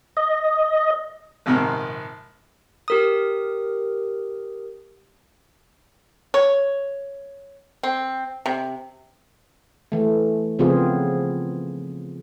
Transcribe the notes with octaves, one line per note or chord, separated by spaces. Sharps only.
D#5
A#1 G#2 C3 D#3 A#4
G4 A#4 D#6
C#5
C4
C3
E3 A3
C#3 F3 B3 C4 F4 G#4